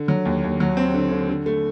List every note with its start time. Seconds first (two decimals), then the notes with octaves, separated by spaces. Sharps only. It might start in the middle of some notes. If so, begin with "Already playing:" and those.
Already playing: D3
0.08 F#3
0.25 D#2
0.44 D#2
0.60 F#3
0.77 C4
0.94 D3
1.11 D3
1.29 D3
1.46 A3